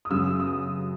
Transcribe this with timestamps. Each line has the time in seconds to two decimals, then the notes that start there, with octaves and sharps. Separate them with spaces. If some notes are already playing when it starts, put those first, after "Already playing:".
0.05 D#6
0.10 F#2 C#3 F#3 E6
0.40 D#6